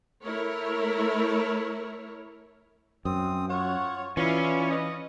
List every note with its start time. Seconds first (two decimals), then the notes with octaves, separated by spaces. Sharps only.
0.23 A3 E4 A#4 C#5
3.05 F#2 C4 D#6
3.50 F4 C#5 F#5
4.17 E3 C#4 E4 F4 D5
4.70 B4 D#5